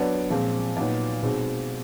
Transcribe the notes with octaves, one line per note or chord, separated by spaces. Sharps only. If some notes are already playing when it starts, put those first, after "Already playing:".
Already playing: F#3 B3 D4
A#2 F3 G#3 C4
A#2 F#3 B3 D#4
B2 G#3 C4 D#4